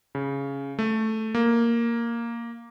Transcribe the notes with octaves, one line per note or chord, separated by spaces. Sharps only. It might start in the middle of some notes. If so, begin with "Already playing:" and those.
C#3
A3
A#3